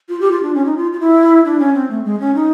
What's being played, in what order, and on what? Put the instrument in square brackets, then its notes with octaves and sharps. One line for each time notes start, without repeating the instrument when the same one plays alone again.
[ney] F4
G4
F4
D4
C#4
D#4
F4
F4
E4
D4
C#4
C4
A3
G#3
C#4
D#4